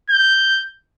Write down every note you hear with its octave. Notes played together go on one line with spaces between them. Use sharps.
G6